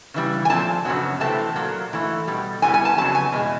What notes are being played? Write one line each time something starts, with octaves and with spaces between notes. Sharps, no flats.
C#3 E3 G3
G#5
A#2 F3 A3 C4 A5
F#2 C#3 F#3 B3
C3 E3 A3 C4 A5
A#2 F#3 A#3
G#2 E3 A3
B2 G3 B3
E2 C3 E3 G3 B3 G#5
G#5
A5
F2 C#3 F#3 B3 A5
G#5
E2 B2 G#3